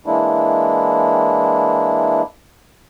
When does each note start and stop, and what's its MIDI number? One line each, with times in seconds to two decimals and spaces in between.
0.06 2.22 52
0.06 2.22 56
0.06 2.22 58
0.06 2.22 62
0.06 2.22 64